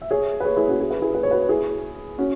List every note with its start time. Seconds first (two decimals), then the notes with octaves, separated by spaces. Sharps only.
0.02 E5
0.11 G#4 C#5
0.40 B4
0.45 G#4 C#5
0.56 E4 G#4
0.68 C#4 F#4
0.80 G#4
0.91 B4
1.01 E4 G#4
1.15 B4
1.23 C#5
1.31 F#4 B4
1.49 E4 G#4
2.18 C#4 F#4